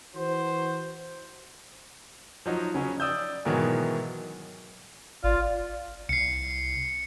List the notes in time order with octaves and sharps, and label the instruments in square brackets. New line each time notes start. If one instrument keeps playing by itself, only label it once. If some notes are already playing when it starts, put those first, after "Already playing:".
[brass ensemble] E3 F#4 C5
[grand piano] F3 F#3 D#4
C#3 F#3 C#4
D5 D#6 E6 G6
G#2 B2 D#3 E3 F#3
[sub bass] G#1 [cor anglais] F4 [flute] D5
[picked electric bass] C2 [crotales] C7 C#7